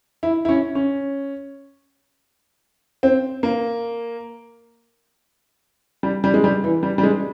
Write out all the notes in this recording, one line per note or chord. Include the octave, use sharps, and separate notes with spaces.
E4
E4
C#4
C#4
C4
A#3
G3
G3
G#3
G3
E3
G3
G3
G#3